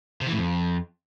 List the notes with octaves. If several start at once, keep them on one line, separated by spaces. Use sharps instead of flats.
C3
E3
A2
F2